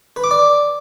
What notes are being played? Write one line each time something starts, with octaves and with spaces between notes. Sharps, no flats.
B4
D6
D5